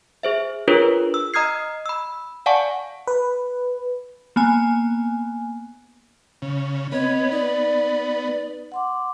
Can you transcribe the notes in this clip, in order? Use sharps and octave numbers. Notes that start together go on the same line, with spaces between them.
G#4 C5 E5
D4 F4 G#4 A#4 B4 C#5
E6
D#5 A#5 D#6 F6 G#6 C7
B5 E6
D5 F5 F#5 G#5 A5 C#6
B4
A#3 B3 G#5
C#3
B3 C4 C#5 D#5
D#4 B4 D5
F#5 C6 D6